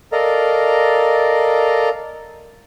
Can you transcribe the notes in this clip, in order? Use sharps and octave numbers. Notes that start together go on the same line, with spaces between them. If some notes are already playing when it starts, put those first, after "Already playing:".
A4 A#4 D5 D#5 F5 A#5